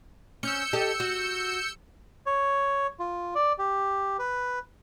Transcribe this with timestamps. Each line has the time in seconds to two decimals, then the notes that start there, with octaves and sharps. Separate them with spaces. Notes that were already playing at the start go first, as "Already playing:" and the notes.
0.43 C#4 E6 G6 C#7
0.73 G4 A4 D#5
1.00 F#4
2.26 C#5
2.99 F4
3.35 D5
3.58 G4
4.19 B4